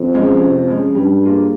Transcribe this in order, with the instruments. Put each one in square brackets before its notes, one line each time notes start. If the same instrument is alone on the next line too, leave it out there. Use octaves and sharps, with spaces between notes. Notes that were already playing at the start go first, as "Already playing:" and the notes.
Already playing: [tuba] F2
[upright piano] F3 G#3 C#4
C3
F3 G#3 C#4
[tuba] G2 [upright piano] G3
[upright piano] A#3 F4 G#4